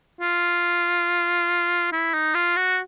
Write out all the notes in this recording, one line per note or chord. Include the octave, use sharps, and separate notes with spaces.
F4
E4
D#4
F4
F#4